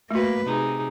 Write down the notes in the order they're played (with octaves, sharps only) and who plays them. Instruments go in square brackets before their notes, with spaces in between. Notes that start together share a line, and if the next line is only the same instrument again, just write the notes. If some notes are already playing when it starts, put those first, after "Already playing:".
[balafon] A3 F#4 [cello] A#3 B4
[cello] C3 [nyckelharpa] D#4 G#4